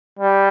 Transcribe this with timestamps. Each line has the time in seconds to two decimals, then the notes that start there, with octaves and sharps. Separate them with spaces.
0.19 G3